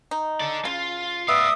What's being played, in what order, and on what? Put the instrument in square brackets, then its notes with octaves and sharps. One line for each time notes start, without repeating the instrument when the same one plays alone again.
[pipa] D#4
[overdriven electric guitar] A4 D5
[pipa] C#3 [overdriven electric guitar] F4
[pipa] B3 [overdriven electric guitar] D5 F5 [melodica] E5 D#6